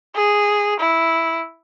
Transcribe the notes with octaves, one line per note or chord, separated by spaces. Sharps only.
G#4
E4